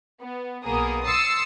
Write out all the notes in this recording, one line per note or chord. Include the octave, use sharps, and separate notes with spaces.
B3
B1 A#3 B3 G#4 A#4 D#6
C6 D#6 E6 A6 C7 C#7